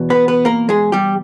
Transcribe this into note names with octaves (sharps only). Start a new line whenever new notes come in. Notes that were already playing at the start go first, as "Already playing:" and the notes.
Already playing: E2 B2
B3 B4
B3 B4
A#3 A#4
G#3 G#4
G3 G4